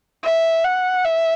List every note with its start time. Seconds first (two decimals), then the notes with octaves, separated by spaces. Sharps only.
0.23 E5
0.64 F#5
1.04 E5